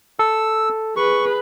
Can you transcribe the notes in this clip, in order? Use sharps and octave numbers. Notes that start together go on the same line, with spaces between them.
A4 E6
G#4 B4 C#6